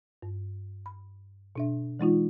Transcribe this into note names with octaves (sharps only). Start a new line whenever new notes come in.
G2
B5
B2 D4 E5
E3 G#3 D#4 F4